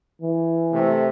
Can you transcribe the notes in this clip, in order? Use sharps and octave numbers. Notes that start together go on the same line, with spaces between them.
E3
C3 A3